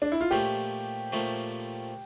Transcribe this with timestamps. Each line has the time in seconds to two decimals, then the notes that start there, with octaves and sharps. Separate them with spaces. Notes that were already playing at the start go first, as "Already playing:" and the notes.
0.02 D4
0.12 E4
0.21 F4
0.31 A#2 F3 A3 C#4 G4
1.12 A#2 F3 A3 C#4